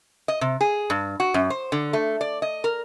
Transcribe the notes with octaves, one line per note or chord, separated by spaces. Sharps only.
D#5
C3
G#4
G2
F#4
F#2
C5
D3
A3
D5
D#5
A#4